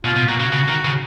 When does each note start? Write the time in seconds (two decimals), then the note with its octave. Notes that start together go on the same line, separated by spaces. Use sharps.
0.05 B2 F4
0.16 B2
0.28 A#2 F#4
0.40 C#3
0.53 C#3
0.69 D#3
0.85 C#3